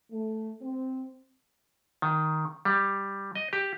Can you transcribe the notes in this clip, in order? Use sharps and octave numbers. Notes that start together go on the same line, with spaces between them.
A3
C4
D#3
G3
D#5
G4